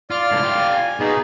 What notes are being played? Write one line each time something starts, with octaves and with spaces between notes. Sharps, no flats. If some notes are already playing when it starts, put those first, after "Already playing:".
F4 D5 F6
C#2 A2
F4 G4
G#5
B2 D#4 G#4